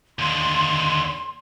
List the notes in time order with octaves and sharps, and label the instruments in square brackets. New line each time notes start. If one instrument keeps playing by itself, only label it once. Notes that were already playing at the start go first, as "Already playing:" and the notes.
[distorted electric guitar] D#2 D3 [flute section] C6